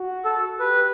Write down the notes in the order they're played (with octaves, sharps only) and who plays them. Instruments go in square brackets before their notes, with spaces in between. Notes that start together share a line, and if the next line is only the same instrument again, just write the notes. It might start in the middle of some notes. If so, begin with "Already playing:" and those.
Already playing: [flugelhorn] F#4
[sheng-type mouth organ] A4
[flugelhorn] G4 [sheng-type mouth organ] B4